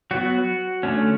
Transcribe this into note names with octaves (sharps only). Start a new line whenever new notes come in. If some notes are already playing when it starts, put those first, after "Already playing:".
F#3 B3 F#4
D3 A3 C#4